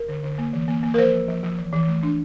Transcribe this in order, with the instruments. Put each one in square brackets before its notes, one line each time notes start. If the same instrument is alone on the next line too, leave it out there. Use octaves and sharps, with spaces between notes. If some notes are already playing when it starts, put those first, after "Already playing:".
Already playing: [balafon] A#4
D3
D3
A#3
E3
A#3
A#3
A#4
F3 C5
F3
F3
F3
E3
E3
A3
D4